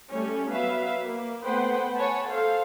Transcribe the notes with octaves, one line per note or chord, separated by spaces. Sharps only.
G3 A3 C#4
F#3 B3 B4 E5 F5
A#3
A3 B3 B4 C5 F#5 G5
C#5 F#5 G#5 A5 B5
A4 C5 F5